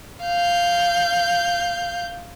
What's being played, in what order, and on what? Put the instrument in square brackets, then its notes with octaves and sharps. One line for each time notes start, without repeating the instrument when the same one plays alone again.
[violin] F5 G6